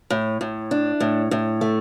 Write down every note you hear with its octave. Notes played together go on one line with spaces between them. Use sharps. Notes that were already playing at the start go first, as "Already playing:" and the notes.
A2
A2
D4
A2
A2
A3